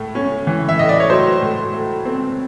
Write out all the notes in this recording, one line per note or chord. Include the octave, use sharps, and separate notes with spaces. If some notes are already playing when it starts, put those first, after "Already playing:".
Already playing: A2 A3
C#4
E3
E5
A2 D#5
D5
C#5
F#3 C5
A2
A3
C4